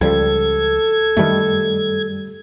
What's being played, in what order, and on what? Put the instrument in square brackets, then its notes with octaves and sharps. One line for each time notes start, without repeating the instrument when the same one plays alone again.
[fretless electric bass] C#2 F3 G3 [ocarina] A4 [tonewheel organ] G#6
[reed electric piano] F#2 G3 [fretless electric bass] D#3 A3